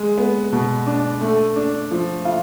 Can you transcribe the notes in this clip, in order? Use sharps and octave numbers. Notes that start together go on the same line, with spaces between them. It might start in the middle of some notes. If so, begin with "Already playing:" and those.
Already playing: G#3
B3
B2
D4
A3
D4
F3
F4